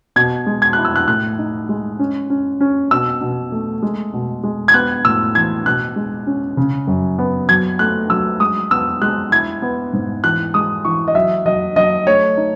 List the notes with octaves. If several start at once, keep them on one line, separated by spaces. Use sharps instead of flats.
B2 G#6
G#3
G#6
E4 F#6
E6
F#6
A2 F#6
D#4
G#3
C#4
C#4
C#4
B2 E6
B2
A3
G#3
B2
G#3
G#6
B3 F#6
A2 E6
E3 G#6
B2 F#6
G#3
C#4
C#3
F#2
B3
F#3 G#6
A3 F#6
F#3 E6
G#3 D#6
B3 E6
G#3 F#6
E4 G#6
B3
G#2
E3 F#6
G#3 D#6
E3 C#6
D#5
F#3 E5
F#3 D#5
F#3 D#5
A3 C#5
D#4